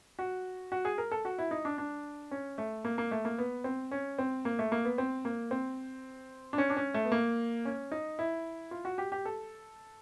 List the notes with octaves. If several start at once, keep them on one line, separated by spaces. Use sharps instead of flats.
F#4
F#4
G#4
A#4
A4
F#4
E4
D#4
D4
D4
C#4
A3
A#3
A#3
A3
A#3
B3
C4
C#4
C4
A#3
A3
A#3
B3
C4
A#3
C4
D4
C#4
D4
C#4
A3
B3
A#3
C#4
D#4
E4
F4
F#4
G4
G4
A4